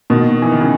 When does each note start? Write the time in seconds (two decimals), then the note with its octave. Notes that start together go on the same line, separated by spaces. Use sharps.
0.10 B2 D#3
0.42 E3
0.51 D#3
0.61 C#3 E3